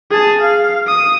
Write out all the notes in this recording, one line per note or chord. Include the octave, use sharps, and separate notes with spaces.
G#4 A5
F5
D#6